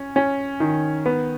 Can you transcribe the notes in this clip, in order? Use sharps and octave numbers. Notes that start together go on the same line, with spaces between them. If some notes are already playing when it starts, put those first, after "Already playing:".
Already playing: C#4
C#4
D#3
B3